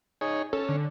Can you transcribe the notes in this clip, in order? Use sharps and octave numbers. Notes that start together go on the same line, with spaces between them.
D#4 G#4 C#5
C#4 A4
D3